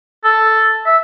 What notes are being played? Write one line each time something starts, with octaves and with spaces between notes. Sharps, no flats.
A4
E5